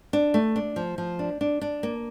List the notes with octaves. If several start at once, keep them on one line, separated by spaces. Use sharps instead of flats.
D4
A3
D4
F3
F3
D4
D4
D4
A#3